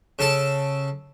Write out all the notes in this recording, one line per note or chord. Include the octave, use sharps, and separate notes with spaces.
C#3 A4 A5